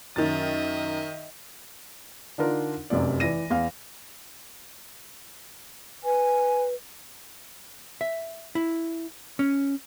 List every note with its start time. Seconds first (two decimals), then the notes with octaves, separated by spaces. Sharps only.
0.16 F#2 D#3 A#4 D#5 E5 A6
2.38 D3 D4 D#4 F4 A#4
2.90 F1 F#2 C3 D5
3.20 E3 D5 A#6 D#7
3.50 E2 F5
6.04 B4 G#5
8.01 E5
8.55 E4
9.39 C#4